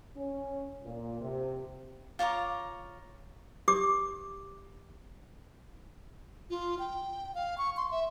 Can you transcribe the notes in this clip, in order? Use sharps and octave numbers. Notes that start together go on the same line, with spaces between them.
C#4
A#2
C3
F4 C#5 A#5 D6
G4 D6
F4
G5
F5
C#6
C6
E5